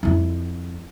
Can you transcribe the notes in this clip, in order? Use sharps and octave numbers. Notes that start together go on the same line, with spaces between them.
F2 E4